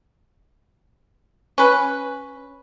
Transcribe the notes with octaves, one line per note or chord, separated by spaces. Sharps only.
C#4 B4